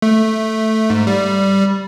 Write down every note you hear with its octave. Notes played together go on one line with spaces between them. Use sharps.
A3
G#2
G3